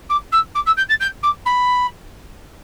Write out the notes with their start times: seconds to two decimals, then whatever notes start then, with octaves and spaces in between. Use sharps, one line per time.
0.09 D6
0.32 E6
0.55 D6
0.66 E6
0.77 G6
0.89 A6
1.00 G6
1.23 D6
1.45 B5